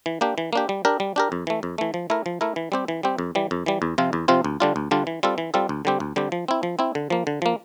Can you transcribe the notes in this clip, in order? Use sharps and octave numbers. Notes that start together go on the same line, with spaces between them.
E3
A#3 D4 G4
E3
A#3 D4 G4
G3
D4 G4 A#4
G3
D4 G4 A#4
F2
E3 A3
F2
E3 A3
F3
A3 E4 A#4
F3
A3 E4 A#4
E3
G3 C4 G4
E3
G3 C4 G4
F2
E3 G3
F2
E3 G3
E2
C3 F3 C4 F4
E2
C3 F3 C4 F4
D2
D3 G3 D4 F4
D2
D3 G3 D4 F4
E3
G3 C4 F4 A4
E3
G3 C4 F4 A4
D2
D3 G3 C4 G4
D2
D3 G3 C4 G4
F3
C4 E4
F3
C4 E4
D3
F3 A#3
D3
F3 A#3